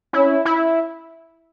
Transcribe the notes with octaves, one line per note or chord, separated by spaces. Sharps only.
C#4 E4
E4